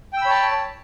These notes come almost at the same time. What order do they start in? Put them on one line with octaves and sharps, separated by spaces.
G5 E6 B5 C#5 A5